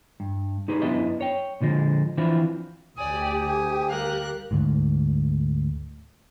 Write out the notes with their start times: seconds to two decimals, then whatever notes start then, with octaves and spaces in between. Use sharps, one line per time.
0.20 G2
0.68 D#4 G4 G#4 B4
0.82 F#2 B3 D4 E4 B4 D#5
1.21 C#5 G5
1.61 A#2 D3 F3 G#3
2.17 E3 F3 C4 D4 E4 F4
2.97 D2 G4 D5 G#5 D#6
3.44 G#5
3.89 G3 A#4 F5 F#6
4.51 D2 G#2